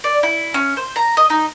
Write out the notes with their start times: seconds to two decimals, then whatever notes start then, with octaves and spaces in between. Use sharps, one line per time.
0.04 D5
0.23 E4
0.54 C#4
0.77 C5
0.96 A#5
1.17 D#5
1.30 D#4